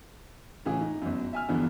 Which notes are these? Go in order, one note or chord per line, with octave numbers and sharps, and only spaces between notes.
A2 C#3 E3 F4 G#4
D#4
G1 F#2
E5 G#5 F6
E2 G2 B2 D3 E3 F3